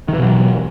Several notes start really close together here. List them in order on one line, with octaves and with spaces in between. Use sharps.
D#3 E3 B2 F#3